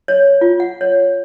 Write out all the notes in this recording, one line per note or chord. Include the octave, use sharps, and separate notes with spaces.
C#5
F4
F#5
C#5